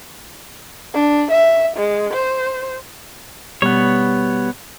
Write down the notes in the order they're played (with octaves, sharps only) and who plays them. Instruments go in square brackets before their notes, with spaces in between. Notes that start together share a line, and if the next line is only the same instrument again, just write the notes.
[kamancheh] D4
E5
G#3
C5
[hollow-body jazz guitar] B2 G3 [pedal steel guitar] B3 C#5